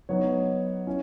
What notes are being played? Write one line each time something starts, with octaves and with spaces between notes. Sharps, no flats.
F#3 B3 D#4 C#5
C#4 E4